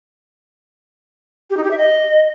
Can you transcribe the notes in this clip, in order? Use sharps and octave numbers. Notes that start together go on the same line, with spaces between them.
G4
D#4
G4
E5
D#5